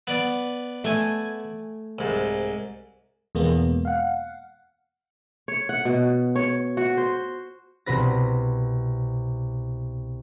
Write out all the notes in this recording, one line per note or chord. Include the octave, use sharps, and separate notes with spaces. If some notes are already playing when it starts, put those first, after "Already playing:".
B3 D5
A3 G#5
C2 G#2
E2 B2 G#3 A#3 B3
F5 F#5
C#5
F#5
B2
C#5
F#4
C5
C2 B2 C4 B4 A#6